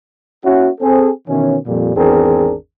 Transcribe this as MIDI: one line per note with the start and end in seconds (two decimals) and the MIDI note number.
0.44 0.68 58
0.44 0.68 61
0.44 0.68 64
0.44 0.68 66
0.80 1.10 60
0.80 1.10 68
0.80 1.10 69
1.27 1.57 47
1.27 1.57 51
1.27 1.57 52
1.27 1.57 61
1.66 1.93 41
1.66 1.93 46
1.66 1.93 55
1.96 2.53 32
1.96 2.53 40
1.96 2.53 60
1.96 2.53 62
1.96 2.53 68
1.96 2.53 70